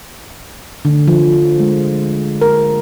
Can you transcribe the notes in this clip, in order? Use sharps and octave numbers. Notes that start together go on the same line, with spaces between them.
D3
F3
G#3
A#4